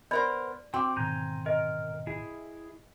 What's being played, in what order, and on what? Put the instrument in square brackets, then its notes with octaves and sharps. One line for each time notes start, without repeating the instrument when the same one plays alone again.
[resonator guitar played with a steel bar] B3 A#4 C5 [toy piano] D5
[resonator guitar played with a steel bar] C4 [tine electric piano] F#4 [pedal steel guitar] G5 D6
[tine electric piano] G#2 B2 D#3 [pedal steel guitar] G#5 A#5 G6
[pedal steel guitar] A#4 [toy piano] D#5
[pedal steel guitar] E4 G#4